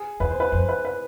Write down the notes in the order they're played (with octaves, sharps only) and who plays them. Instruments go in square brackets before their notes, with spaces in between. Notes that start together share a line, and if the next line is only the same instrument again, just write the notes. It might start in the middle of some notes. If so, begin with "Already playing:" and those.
Already playing: [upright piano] G#4
[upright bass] E2 [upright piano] B4
[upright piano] C5
B4
[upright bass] F2 [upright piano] C5
[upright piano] B4
B4